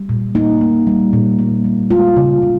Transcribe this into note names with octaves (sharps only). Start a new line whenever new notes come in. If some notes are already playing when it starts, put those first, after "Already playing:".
Already playing: G3
A#2
A#3 D#4
A#3
G3
A#2
A#3
G3
G#3 F4
C#3
C#3